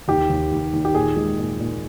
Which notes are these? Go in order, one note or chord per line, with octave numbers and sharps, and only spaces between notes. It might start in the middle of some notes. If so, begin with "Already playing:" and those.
D#2 G4
D#2
D#2
D#2
G4
A#2 G#4
G#3
A#2
A#2